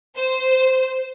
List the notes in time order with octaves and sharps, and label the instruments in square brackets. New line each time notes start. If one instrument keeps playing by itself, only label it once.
[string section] C5